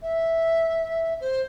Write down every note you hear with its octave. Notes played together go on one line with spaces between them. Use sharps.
E5
C5